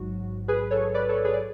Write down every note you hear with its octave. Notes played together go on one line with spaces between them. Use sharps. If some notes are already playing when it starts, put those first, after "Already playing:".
Already playing: A1 G#2 F#3 F#4
G#4 B4
A4 C#5
B4 D5
A4 C#5
G#4 B4
D5